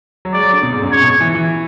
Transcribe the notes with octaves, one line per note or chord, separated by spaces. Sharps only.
F#3
G#3 D5
F#3
D3
B2
G#2
F#2
G#2 C#5
B2
E3
E3